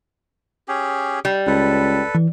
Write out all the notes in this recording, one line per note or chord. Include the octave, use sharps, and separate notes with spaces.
C#4 G4 G#4
G3
C#2 A4 B4
E3